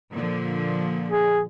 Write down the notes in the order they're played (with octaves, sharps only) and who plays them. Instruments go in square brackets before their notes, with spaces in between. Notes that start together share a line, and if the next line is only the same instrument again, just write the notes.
[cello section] A#2 D3 F3
[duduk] G#4